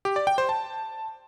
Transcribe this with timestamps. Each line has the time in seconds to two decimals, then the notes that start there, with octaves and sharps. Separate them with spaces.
0.05 G4
0.16 D5
0.27 G5
0.38 C5
0.49 A5